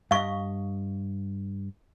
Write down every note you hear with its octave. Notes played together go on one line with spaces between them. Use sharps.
G2 D#5 F5 C#6